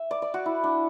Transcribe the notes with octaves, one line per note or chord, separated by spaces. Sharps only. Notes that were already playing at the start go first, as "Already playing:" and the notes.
Already playing: E5
D5
D5
F#4
E4
D4